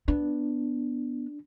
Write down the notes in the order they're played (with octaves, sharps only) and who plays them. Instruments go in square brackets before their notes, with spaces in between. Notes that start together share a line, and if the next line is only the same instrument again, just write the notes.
[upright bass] B3 [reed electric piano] D4